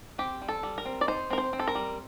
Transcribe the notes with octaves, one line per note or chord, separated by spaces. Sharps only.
C4 G4
G3
A4
G3
A#4
C4
D5
D#4 C5
C4 A#4
C5
C4
A4
A#4
G3